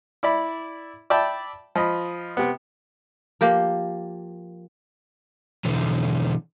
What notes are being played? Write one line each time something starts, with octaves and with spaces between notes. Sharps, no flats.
E4 D5 B5
D5 E5 G5 A5 B5
F3 D#5 B5
C3 B3
F3 A#3 G4 A#4
B2 D3 E3